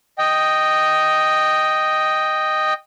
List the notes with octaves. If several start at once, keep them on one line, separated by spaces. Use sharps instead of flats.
D#5 G5